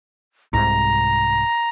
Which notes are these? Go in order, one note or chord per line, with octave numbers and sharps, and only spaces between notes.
C2 G#2 C3 A#5